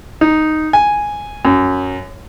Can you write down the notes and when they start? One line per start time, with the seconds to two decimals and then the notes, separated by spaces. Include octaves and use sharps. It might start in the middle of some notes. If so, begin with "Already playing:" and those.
0.21 D#4
0.73 G#5
1.45 F#2